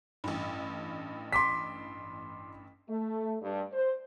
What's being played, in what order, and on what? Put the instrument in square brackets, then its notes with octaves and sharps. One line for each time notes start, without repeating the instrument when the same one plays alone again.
[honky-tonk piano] A1 G2
[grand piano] C6 D6 B6
[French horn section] A3
G2
C5